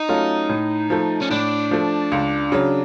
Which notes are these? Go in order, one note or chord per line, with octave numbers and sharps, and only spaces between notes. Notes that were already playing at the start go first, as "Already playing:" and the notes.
Already playing: D#4
F#3 A3 C#4 F4
A2
F3 A3
C#4
A2 D4
F3 A3
C#2
C#3 F#3